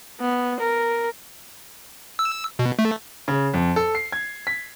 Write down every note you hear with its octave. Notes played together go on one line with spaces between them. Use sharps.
B3
A#4
E6
B2
A3
C#3
F2
A4
C7
G#6
B6